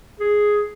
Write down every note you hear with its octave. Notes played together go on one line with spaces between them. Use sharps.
G#4